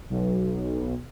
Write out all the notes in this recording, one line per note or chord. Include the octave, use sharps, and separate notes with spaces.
B1